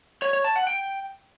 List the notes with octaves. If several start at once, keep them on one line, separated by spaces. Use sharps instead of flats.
C#5
C#5
A5
F#5
G5